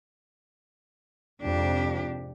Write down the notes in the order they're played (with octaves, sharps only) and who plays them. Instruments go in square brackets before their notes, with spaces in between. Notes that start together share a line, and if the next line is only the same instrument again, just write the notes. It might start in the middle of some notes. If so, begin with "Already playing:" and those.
[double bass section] F2 G#2 C3 [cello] D4 G4